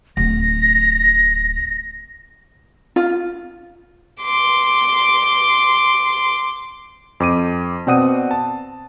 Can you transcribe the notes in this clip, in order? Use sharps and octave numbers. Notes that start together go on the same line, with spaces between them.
D1 D4 A#6
F4
C6 D6
F2 D6 D#7
B2 C4 D5 F#5 D#6 D#7
A5